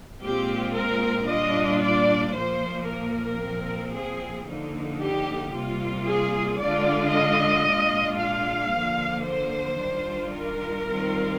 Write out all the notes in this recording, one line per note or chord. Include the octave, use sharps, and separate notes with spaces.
A#2 G#3 C4 F4 G4
A#4
A#2 G3 D4 F4 D#5
D5
A#2 F3 A#3 C5
A#4
A#2 F3 C4
G#4
D3 F3 A#3 D#4
G4
C3 G3 A#3 F4
G#4
D3 G#3 D4 F4 D5
D#5
A#2 G#3 D4 F4
F5
D3 F3 A#3
C5
D#3 G3 D4 F4
A#4
D#3 G3 C4 F4